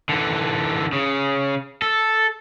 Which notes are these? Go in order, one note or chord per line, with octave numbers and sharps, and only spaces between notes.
D3 E3
C#3
A4